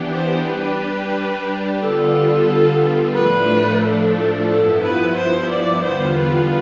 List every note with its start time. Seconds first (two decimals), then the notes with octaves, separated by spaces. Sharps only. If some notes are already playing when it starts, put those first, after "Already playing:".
Already playing: E3 B3 D4 G4
0.14 C5
0.47 G3 D4 G4 B4
1.81 D3 G3 B3 F4 A4
3.15 A2 F3 A3 D4 B4
3.83 A4
4.49 G2 F3 B3 E4 A4
4.84 B4
5.17 C5
5.51 D5
5.84 E2 D3 G3 B3 F4 C5
6.18 B4